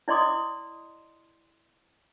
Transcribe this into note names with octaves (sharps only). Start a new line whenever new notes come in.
E4 D5 D#5 C6 D6 D#6